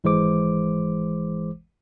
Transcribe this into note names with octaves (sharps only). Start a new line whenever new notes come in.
G#1 E3 G#3 C5 D6